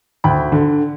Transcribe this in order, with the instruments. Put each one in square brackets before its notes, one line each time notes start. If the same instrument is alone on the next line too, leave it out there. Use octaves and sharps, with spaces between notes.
[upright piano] D2 G5 B5
D3